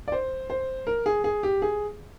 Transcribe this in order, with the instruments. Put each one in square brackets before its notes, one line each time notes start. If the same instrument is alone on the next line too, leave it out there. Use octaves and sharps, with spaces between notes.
[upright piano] D5
C5
C5
A#4
G#4
G#4
G4
G#4